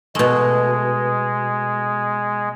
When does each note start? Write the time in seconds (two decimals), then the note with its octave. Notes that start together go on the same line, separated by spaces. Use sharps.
0.15 B2 G#3 A3